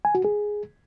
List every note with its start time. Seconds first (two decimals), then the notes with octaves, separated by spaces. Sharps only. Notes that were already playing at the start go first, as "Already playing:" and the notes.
0.05 G#5
0.15 F#4
0.25 G#4